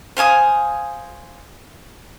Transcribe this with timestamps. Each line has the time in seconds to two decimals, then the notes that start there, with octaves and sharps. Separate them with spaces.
0.17 C5 F5 G#5 D#6